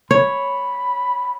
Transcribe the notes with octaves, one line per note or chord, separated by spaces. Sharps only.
C#5 B5